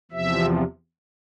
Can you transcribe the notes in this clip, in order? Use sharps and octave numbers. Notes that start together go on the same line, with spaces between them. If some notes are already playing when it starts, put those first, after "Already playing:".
E2 C3 F3 E5